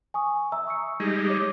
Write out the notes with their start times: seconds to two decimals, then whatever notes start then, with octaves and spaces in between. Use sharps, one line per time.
0.14 G#5 C#6 D#6
0.52 E5 A#5 E6
0.67 C#6 E6 C#7
1.00 G3 G#3 D#4 G#6
1.27 C#5 D6